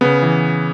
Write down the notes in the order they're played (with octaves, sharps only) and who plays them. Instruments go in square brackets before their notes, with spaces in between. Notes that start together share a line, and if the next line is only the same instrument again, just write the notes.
[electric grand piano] C#3 B3
E3